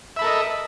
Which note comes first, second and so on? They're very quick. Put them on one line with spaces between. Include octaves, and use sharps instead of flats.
E5 B5 A4 A#4 D#5